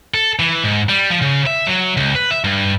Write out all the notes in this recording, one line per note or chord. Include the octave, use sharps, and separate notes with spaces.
A4
E3
G#2
G3
F3
C#3
E5
F#3
C#2
B4
E5
G2